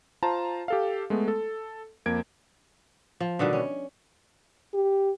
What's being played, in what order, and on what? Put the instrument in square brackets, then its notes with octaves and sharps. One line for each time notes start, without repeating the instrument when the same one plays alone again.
[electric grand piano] F4 C5 A5 A#5
G4 A4 F5
G#3 A3 B3
A4
F2 A#3 G#6 D7
[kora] F3
B2 D3 D#3 G3
C#4
[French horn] G4